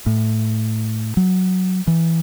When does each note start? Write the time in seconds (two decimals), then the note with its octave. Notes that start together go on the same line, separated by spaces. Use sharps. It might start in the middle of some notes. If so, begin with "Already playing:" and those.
0.06 A2
1.17 F#3
1.87 E3